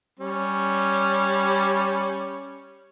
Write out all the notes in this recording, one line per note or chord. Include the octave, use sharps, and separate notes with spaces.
G3 C#4